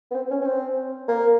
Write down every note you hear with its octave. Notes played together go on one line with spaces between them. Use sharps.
B3
C4
C#4
C#4
C4
A#3